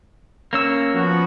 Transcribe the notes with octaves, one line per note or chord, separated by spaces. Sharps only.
A#3 C#4 E6
F3 B3 F#4